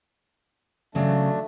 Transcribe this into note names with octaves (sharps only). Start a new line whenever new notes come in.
C#3 F#3 A3 D4